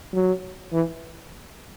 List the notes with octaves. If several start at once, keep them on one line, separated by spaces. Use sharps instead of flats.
F#3
E3